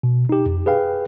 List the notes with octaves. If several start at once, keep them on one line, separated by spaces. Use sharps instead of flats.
B2
D#4 G4
F2
G#4 B4 F5 G5